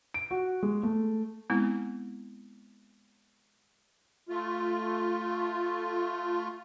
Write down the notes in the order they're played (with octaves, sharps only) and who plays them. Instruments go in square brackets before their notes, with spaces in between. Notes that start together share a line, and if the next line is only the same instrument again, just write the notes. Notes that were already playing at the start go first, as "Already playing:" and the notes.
[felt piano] D7
F#4
G#3
A3
[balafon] G#3 B3 C4 E4
[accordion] A3 F4